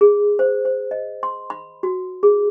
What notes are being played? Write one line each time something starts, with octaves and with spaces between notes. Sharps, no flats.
G#4
C5
C5
D#5
C6
B5
F#4
G#4